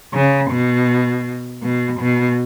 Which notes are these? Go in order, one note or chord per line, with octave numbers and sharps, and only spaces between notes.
C#3
B2
B2
B2